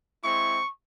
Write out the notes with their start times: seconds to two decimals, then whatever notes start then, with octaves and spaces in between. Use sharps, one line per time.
0.23 G#3 C4 E4 C#6